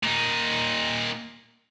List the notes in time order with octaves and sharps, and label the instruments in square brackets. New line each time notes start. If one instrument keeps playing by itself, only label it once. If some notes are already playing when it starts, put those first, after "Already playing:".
[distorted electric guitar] A#2 D#4